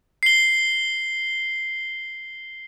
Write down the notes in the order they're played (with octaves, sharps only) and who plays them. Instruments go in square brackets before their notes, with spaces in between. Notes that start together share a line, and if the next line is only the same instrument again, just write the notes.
[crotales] C7 G7